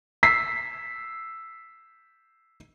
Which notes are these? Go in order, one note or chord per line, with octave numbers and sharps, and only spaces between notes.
E6 B6 C7